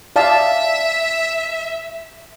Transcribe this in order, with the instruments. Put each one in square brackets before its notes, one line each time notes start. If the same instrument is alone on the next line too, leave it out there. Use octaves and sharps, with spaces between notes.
[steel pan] D5 F5 A5 [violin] E5